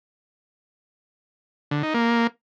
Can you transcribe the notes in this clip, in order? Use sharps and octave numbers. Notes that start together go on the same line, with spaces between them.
D3
D#4
A#3